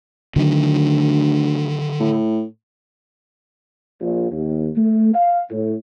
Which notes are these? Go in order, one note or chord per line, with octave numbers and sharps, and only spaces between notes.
D2 D3 D#3 F#3
A2
A#1
D#2
A3
F5
A2